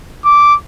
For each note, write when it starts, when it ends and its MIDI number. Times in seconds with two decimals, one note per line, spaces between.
0.25 0.55 86